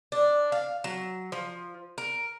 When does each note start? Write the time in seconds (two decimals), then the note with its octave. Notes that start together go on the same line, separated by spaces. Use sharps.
0.12 D4
0.52 F5
0.84 F#3
1.32 F3
1.98 A#4